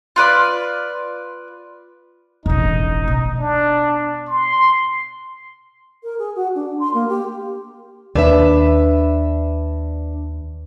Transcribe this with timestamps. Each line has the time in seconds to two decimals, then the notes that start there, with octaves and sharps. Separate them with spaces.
0.16 F4 B4 D5
2.46 E1 A1 D#4
3.08 B2
3.40 D4
4.27 C6
6.04 A#4
6.19 G#4
6.36 F#4
6.55 D4
6.80 C6
6.94 A#3
7.09 G4
8.15 D#2 D4 B4 E5